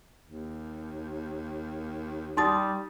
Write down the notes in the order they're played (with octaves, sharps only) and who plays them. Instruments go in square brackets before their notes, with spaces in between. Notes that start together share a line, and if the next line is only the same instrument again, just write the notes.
[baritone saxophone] D#2
[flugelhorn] G3 [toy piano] D#4 D#6 [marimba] C6 A6